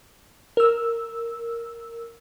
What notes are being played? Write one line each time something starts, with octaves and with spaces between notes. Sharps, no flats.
A#4 E6